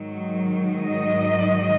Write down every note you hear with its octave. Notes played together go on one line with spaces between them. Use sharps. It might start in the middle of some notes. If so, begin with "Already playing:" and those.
Already playing: G#2 D#3 F#3
D#5